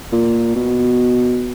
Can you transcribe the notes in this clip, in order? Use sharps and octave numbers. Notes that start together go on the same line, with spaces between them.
A#2
B2